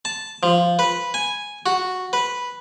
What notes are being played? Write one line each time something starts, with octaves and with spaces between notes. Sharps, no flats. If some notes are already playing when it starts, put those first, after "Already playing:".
A5
F3
B4
G#5
F#4
B4